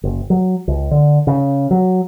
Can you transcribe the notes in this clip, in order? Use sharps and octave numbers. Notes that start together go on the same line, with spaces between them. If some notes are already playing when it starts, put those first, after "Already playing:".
F#1
F#3
C#2
D3
C#3
F#3